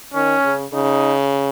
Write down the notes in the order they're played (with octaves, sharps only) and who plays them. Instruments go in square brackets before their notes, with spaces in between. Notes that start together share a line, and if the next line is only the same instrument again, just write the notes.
[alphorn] D#3 [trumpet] C#4
[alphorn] C#3
[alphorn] C#3 [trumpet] D#4